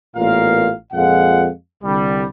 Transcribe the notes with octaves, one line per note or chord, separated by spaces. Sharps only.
A1 A#2 B3 F4 A#4 F5
F2 A#2 G#3 F5 F#5
C2 D3 G3